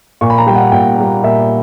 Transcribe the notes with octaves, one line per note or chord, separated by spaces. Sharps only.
A#2 C#6
B5
A#5
G3 A#3 F#5 G5
A#2 G5
G3 A#3
A#2 E5